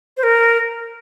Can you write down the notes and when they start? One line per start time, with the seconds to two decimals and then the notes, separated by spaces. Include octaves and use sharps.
0.17 C5
0.23 A#4